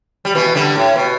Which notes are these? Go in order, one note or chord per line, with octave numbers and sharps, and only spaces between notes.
G3
B2 E3
D3 G3
A2
B2